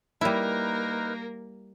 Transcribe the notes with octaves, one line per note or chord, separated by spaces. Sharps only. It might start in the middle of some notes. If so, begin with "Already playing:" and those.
G3 A#3 D#4 E4 A#4 B4 F6